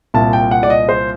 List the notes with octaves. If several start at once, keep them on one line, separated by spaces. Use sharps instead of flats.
C2 A#2 A5
G5
F#5
D5
D#5
C5